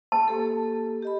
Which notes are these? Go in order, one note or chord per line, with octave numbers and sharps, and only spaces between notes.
A5
A#3 G4 A4
G4 D#5 B5